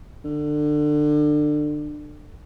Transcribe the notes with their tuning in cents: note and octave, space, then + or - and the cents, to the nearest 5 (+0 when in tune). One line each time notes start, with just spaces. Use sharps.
D3 +25